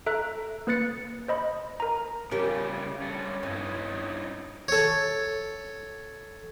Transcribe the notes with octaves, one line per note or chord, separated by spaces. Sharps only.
A4 E5 A#5 F#6
A#3 B4 F#6 A6 C#7
C5 D#5 B5
A#4 A#5
C#3 G3 A3 C#4 G4 A#4
G3 A4 C#5
G2 C#4 D#4 E4
A4 C#5